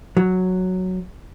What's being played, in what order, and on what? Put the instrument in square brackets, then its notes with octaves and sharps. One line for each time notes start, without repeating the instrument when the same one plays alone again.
[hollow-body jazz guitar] F#3